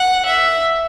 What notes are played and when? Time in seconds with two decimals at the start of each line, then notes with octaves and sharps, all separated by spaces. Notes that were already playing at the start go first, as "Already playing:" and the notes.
Already playing: F#5
0.25 E5